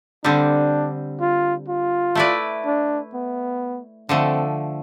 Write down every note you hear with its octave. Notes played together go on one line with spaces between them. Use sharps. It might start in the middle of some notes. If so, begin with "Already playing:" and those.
D3 G3 C4 D4
F4
F4
A3 E4 B4 D5
D4
B3
D3 F3 A3 C4